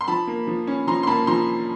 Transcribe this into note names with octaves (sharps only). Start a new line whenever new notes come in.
C6
F3 A5 B5
A#3
F3
C#4
F3 A#5 C6
C6
A#3 A5 B5
F3 A#5 C6